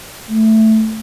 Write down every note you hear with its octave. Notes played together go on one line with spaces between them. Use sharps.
A3